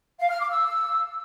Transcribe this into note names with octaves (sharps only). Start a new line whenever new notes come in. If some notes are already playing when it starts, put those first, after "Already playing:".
F5
F6
D6
E6